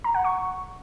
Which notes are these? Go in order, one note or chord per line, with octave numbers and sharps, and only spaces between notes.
A#5
F#5
C#6